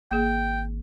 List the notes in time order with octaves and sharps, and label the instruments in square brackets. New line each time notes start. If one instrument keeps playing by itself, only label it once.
[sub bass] G#1 [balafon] A#3 G#4 [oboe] G5